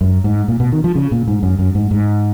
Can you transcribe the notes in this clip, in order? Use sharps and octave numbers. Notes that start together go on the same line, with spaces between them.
F#2
G#2
A#2
B2
D#3
F3
C#3
A#2
G#2
F#2
F#2
G#2
G#2